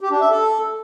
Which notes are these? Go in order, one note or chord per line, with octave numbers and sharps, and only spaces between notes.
G4
D4
E5
A4